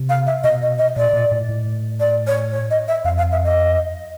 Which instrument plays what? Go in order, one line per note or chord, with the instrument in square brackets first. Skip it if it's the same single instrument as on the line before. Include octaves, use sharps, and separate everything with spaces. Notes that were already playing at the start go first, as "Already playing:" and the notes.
Already playing: [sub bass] C3
[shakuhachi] F5
E5
[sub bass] B2 [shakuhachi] D#5
[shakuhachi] D#5
D#5
[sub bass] A#2 [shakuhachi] D5
[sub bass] A#2
A2
A2
[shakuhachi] D5
C#5
C#5
D#5
E5
[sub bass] F2 [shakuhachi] F5
[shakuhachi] F5
E5
D#5